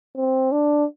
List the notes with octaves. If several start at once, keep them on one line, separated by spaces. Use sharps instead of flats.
C4
D4